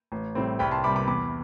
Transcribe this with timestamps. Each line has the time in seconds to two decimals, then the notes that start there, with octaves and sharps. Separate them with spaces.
0.12 A1
0.35 A2 G3 C4
0.59 C2 G5 B5
0.71 A5 C6
0.84 C3 G3 B5 D6
0.96 B5 D6
1.07 E2 B5 D6